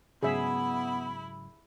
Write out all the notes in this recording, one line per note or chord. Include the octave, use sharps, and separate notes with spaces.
G#2 C#3 F#3 B3 E4 G#4 E5 B5